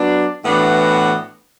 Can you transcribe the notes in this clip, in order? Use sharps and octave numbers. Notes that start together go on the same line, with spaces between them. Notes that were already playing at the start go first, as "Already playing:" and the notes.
Already playing: F#3 B3 D4
A2 E3 B3 D4 F#4